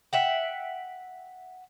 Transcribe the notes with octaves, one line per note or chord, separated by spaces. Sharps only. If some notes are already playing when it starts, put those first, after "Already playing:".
E5 F#5 G5